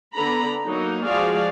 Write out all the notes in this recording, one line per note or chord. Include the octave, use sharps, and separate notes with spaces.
D3 B3 A#5 B5
F#3 A#3 D#4
F3 G#3 F#4 G#4 D5 F5